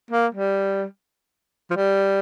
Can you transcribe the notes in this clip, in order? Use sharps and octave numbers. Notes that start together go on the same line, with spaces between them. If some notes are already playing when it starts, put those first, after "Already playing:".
A#3
G3
F3
G3